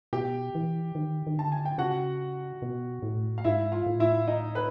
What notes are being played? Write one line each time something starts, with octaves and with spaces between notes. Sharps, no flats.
B2 G4 G5
E3
D#3
D#3
D3 A5
G#5
G5
C#3 F#4 F#5
B2
A2
F5
G#2 E4 E5
F4 F5
A2
E4 E5
D#4 D#5
B4